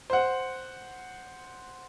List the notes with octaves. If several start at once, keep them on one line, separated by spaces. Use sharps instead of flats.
C5 F#5